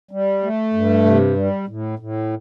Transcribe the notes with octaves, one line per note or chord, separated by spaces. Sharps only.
G3
A3
G2
C3
G3
A2
A2